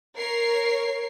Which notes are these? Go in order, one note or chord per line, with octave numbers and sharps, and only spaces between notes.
A#4 C#5 C7